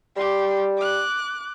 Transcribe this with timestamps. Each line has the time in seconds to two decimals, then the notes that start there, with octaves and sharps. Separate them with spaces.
0.16 G3 G4 C6
0.77 D6 F#6